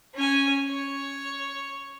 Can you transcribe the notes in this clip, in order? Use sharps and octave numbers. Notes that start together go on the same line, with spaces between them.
C#4 G#5
C#5